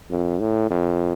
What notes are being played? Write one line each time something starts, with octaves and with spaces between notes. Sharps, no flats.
F2
A2
F2